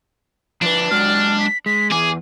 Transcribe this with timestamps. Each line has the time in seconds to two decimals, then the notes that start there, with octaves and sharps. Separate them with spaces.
0.62 F3 D4 B4
0.91 F#3 G#3 F#4 F6
1.40 B6
1.66 G#3 B6
1.91 E2 G#4 D6